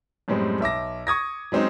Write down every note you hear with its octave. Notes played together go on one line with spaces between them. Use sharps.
F#2 A2 G3 G#3 C4
B1 E5 D6 A#6
C#6 D#6 G#6 A#6
F#3 G#3 C4 C#4 D#4